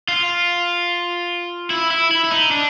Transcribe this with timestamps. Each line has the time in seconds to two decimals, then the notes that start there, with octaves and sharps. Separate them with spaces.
0.08 F4
1.70 E4
1.91 E4
2.11 E4
2.24 E4
2.31 D#4
2.51 D4